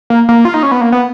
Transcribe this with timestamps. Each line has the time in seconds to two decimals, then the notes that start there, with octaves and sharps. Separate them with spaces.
0.10 A#3
0.29 A#3
0.45 F4
0.54 D#4
0.63 C#4
0.72 B3
0.81 A#3
0.92 B3